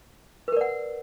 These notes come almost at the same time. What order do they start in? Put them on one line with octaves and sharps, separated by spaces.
B4 A#4 D5 F#5